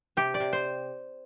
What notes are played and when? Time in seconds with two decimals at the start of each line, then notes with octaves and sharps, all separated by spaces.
0.17 C3 G4
0.34 D5
0.40 C3
0.53 C5